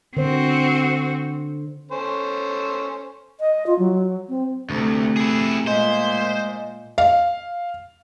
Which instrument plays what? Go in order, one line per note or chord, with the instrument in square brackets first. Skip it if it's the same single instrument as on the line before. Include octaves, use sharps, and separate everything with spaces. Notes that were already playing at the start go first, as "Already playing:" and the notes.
[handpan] D3 C5 [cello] C4 F#4
[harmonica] C#4 A4 C5
[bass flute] D#5
F4
F#3
C4
[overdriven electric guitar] D2 [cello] C3 A3
[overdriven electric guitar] E4 G#4
[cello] A#2 [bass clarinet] G#3 [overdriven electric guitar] C5
[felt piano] F5